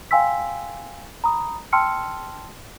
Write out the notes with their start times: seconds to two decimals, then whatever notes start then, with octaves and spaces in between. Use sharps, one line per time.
0.11 F5 G5 G#5 C6 E6 B6
1.24 A#5 B5 D#6
1.73 G5 A5 C6 E6 F6 C#7